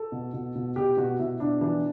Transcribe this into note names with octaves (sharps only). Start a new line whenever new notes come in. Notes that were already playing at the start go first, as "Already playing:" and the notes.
Already playing: A4
B2
B2
B2
B2 G4
B2 F#4
B2 E4
B2 D4
E3 D4